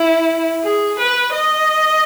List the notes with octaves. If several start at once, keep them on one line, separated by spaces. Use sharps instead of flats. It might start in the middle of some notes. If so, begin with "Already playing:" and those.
Already playing: E4
G#4
B4
D#5